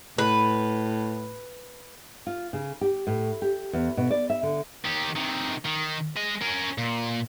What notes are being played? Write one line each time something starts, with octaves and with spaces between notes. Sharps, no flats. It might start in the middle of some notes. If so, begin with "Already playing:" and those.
A2 B4
F4
C#3
G4
A2
G4
E2
B2
D5
E5
D3
D#3 G4
C3 D#3
D#3
G#3 D#5
C#4 A#4
A#2